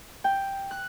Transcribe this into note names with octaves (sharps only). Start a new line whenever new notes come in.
G5
F#6